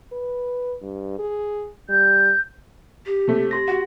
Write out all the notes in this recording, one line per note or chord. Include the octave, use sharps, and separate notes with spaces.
B4
G2
G#4
G3 G6
G4
C3 A3
G4 C6 A#6
F#4 F#5